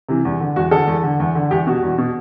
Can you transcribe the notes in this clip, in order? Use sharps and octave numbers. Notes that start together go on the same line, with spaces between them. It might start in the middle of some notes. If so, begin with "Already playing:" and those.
C3 E3
E2
D3
E2 F#4
D3 A4
E2
D3
E2
D3
E2 G4
B2 F#4
E2
B2